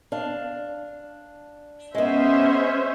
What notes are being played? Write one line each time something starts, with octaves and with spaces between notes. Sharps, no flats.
D4 F5
G#3 B3 C#4 C5 E5